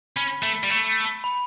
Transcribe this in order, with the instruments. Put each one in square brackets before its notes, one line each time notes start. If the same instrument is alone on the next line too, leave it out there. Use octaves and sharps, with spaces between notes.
[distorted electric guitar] C#4 [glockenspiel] B5
[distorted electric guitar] A3
G3
A3
[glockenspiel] B5